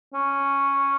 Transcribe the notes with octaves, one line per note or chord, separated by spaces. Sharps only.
C#4